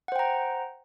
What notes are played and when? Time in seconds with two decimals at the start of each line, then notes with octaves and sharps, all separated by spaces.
0.08 F#5
0.12 C5
0.16 G5
0.19 A#5